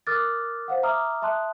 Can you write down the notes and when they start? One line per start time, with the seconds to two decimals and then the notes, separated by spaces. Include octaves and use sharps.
0.07 A#4 D6 D#6 F6 F#6 A6
0.68 C5 F5 F#5
0.83 E5 A#5 D6 D#6 F6
1.22 E5 A5 C6 D#6 F#6